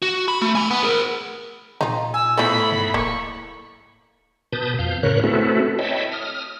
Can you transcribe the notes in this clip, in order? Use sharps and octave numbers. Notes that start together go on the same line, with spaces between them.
F#4
B5
A3
G#5 B5
B3
G#4 A#4
A#2 D#4 F4
G#5 E6
A2 F3 B3 E4 A4 B5
G#2
D1 A#3 C#6
B2 B4 A5 D#6 G6
F2 F5 G6
A2 C#3 A#4 B4 C#5 F#6
A3 C4 E4 F#4 A4 B4
C#5 D#5 E5 G5 A5 B5
D#6 F6